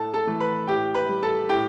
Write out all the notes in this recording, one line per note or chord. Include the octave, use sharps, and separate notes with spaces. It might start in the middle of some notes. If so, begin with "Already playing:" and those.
Already playing: A2 A4 A5
A4 A5
E3 A3
B4 B5
A2 G4 G5
B4 B5
G3
A4 A5
A2 G4 G5